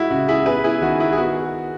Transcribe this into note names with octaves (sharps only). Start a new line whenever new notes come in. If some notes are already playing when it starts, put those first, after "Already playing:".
Already playing: G#3 E4 F#4
C#3 F#4
E4 G#4
B3 G#4 B4
E4 G#4
D#3 F#4
E4
G#4
B3 F#4